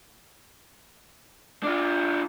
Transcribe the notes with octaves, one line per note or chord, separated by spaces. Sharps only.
D4 F4